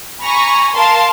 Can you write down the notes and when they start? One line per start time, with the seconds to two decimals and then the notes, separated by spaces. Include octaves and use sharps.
0.22 G#5 A#5 B5 C#6 A#6
0.73 A#4 F5 A5 C6